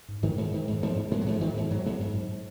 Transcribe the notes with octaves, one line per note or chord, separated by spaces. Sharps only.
G#2
G#2 D#3
G#2
G#2 D#3
G#2
G#2 F3
G#2
G#2 G#3
F#3
G#2 F3
G#2 D#3
G#2
G#2 F#3
G#2
G#2
G#2